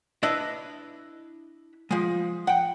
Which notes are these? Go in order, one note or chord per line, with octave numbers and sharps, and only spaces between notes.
D4 E4 B4 D#5 E5
F3 G#3
F#5 G5